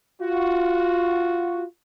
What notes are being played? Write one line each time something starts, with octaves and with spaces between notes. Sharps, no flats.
F4 F#4